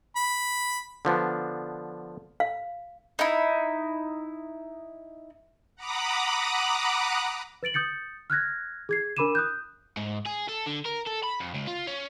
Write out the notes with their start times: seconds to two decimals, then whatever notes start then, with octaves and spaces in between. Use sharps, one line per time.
0.16 B5
1.05 D3 F3 B3 D4
2.40 F5
3.19 D#4 E4
5.76 F#5 A#5 B5 D6 D#6 F#6
7.63 B4 A6 D7 F#7
7.74 D#6 G6 A6 C#7
8.30 F6 F#6 G#6 A#6
8.89 G#4 G#6 C7
9.17 D4 A#4 B5 D6 D#7 E7
9.35 D#6 F#6 G6
9.97 G#2
10.26 G#4
10.48 A4
10.66 D3
10.85 A#4
11.06 A4
11.23 B5
11.40 F2
11.54 C#2
11.67 F4
11.87 C#4